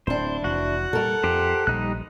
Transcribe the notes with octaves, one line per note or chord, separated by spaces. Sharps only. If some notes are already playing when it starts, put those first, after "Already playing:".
D1 C4 D4 E4 C5
F1 E3 F#4 F#5
A#2 G3 A4 A#4
F2 G4 C5
A#1 G3 D#4 F#6